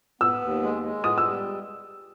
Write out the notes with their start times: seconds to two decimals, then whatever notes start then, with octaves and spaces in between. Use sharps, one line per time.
0.21 B3 E6
0.42 D#2
0.62 G#3
0.83 G#3
1.04 B3 D#6
1.18 E6
1.24 G3